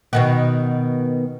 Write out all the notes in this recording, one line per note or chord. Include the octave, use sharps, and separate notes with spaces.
B2 D#3 F#4